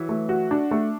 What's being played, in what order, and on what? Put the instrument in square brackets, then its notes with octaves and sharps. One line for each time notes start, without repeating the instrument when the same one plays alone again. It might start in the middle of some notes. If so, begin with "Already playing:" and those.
Already playing: [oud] E3 F#3
[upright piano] A3
F#4
D4
A3